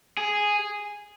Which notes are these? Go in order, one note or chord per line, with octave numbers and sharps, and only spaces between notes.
G#4